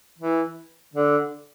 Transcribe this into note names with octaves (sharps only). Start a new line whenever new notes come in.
E3
D3